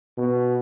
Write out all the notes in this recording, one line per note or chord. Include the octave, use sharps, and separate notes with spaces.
B2